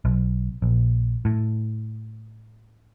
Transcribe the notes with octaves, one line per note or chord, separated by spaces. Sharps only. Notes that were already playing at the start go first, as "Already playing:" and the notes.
B1
A#1
A2